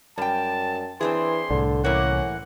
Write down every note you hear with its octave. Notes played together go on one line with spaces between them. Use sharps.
F#2 G3 G5 A5
E3 C4 D4 G#4 C6
C2 A2 D3
E3 A#3 C#4 F#5